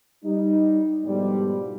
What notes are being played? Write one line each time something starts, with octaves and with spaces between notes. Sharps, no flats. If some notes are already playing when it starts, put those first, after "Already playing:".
G3 D#4
G#2 B2 D3 F3 G3